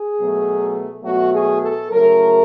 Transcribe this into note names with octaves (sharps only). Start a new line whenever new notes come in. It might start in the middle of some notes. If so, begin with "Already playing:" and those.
Already playing: G#4
B2 F#3 A3
B2 F#3 A3 F#4
G#4
A4
C#3 F#3 A3 A#4